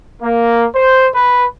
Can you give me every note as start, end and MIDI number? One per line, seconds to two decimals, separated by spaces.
0.21 0.65 58
0.74 1.06 72
1.14 1.45 71